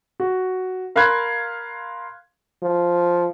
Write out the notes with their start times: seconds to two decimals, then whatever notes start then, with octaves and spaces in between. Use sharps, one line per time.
0.20 F#4
0.96 A#4 F5 B5 C6 F#6 G#6
2.63 F3